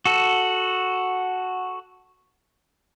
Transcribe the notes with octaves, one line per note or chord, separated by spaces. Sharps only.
F#4 A4